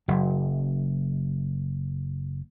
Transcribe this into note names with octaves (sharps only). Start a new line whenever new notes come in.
F#1 F#2